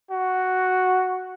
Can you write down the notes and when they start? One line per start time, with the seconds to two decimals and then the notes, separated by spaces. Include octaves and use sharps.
0.11 F#4